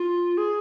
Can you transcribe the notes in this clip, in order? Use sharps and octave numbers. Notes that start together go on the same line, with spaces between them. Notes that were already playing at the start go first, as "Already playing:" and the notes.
Already playing: F4
G#4